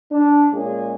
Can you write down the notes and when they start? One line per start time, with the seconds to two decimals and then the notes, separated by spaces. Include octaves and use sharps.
0.11 D4
0.54 A#2 G#3 C#4 G#4